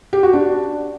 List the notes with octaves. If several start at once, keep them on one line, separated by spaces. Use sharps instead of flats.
G4
F#4
D4